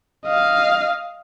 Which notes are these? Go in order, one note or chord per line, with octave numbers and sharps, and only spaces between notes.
D#5 F5